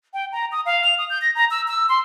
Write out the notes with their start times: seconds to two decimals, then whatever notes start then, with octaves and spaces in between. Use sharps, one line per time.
0.14 G5
0.32 A#5
0.52 D#6
0.66 F5
0.84 F7
0.98 D#6
1.10 G6
1.22 A#6
1.35 A#5
1.51 E6
1.68 E6
1.89 C6